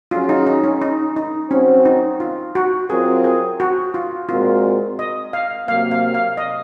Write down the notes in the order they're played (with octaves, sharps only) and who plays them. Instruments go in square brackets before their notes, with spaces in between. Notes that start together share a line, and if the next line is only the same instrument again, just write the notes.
[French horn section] F#3 C#4 G#4 [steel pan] F4
[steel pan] D#4
D#4
C#4
D#4
D#4
[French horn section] F#3 C4 F#4 C5 [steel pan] C#4
[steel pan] D#4
F4
F#4
[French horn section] F#3 C4 F4 A#4 [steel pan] G#4
[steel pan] G#4
F#4
F4
[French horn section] A#2 G#3 C4 F#4 A#4 [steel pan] F4
[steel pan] D#5
F5
[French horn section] C3 F#3 A#3 [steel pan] F5
[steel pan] F5
F5
D#5